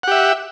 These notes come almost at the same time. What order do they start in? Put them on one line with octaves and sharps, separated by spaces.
F#5 G4 E5